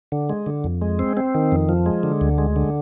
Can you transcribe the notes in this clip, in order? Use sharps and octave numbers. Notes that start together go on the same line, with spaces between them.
D3
G#3
D3
F2
G#3
C4
C4
D#3
F2
F3
G#3
D3
D2
G#3
D3